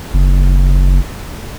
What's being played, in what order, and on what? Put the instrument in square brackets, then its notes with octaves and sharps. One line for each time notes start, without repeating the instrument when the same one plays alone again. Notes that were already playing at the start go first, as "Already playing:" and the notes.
[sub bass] F#1